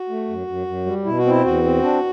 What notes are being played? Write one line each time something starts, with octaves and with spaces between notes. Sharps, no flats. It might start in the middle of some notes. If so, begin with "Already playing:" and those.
Already playing: F#4
A3
F#2
F#2
F#2
G3
B2 E4
F#4
C4 E4
E2 F#4
C4
D4